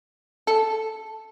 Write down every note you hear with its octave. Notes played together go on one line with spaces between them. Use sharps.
A4